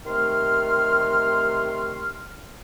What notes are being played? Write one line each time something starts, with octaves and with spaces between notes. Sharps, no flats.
C3 D#3 A3 C6 F6